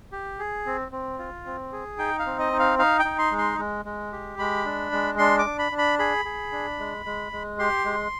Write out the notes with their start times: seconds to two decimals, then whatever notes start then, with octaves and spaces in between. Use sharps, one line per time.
0.12 G4
0.39 G#4
0.66 C4
0.92 C4
1.19 F4
1.46 C4
1.72 G#4
1.98 D#4 G5
2.19 F5
2.26 C4
2.39 D#5
2.53 D#4
2.59 F5
2.79 D#4 F5
2.99 G5
3.05 D#4
3.18 C6
3.31 G#3
3.38 C6
3.58 G#3
3.85 G#3
4.12 G4
4.39 G#3 B5
4.65 D4
4.92 G#3
5.18 D4 C6
5.39 D6
5.46 D4
5.59 B5
5.72 D4
5.78 B5
5.99 G#4 B5
6.25 G#4
6.52 D4
6.79 G#3
7.06 G#3
7.32 G#3
7.59 G4 C6
7.85 G#3